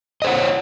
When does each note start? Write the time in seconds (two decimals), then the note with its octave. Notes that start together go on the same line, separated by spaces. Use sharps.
0.22 D#5
0.24 C5
0.27 F#5
0.30 C#5